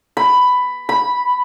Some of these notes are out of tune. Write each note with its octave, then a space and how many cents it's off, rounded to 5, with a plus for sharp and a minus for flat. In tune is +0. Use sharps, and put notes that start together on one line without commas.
B5 +10
B5 -5